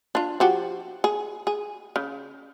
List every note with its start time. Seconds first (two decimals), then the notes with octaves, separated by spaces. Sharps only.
0.15 D4 F4
0.40 F3 F#4 G4
1.04 G#4
1.47 G#4
1.96 C#3